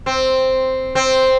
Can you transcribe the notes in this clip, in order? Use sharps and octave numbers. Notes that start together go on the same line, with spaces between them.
C4
C4